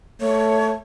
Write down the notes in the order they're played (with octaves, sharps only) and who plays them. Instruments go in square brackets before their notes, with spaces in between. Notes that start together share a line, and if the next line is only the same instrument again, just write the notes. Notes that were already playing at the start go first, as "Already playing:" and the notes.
[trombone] A3 [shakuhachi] C#5